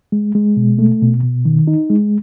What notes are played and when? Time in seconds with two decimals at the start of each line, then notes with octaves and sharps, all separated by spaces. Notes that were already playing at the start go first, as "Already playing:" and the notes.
0.12 G#3
0.35 G#3
0.57 B2
0.79 A3
1.02 B2
1.23 B2
1.45 D#3
1.67 D#4
1.90 G#3